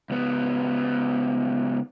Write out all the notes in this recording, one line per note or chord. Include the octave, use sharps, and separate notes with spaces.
C#2 B3